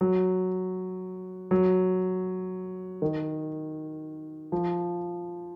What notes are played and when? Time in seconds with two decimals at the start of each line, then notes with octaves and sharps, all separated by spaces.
0.01 F#3
1.51 F#3
3.02 D#3
4.52 F3